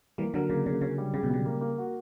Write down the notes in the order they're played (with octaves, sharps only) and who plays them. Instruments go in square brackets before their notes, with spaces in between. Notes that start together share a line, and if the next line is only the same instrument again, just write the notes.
[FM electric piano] E3 G3 [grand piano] A#3
[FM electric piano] D3 F#3 [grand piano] A#4
[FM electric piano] C#3 [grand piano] A#3
[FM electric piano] C#3 [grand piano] A#3
[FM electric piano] C#3 [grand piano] C#4
[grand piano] G3
[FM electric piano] C#3 [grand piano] G3
[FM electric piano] B2
[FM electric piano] C#3 [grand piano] G3
[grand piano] A#3
A#3
F#4